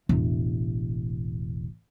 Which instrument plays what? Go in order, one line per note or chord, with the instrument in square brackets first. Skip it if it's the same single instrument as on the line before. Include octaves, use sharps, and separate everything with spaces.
[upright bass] E1 A1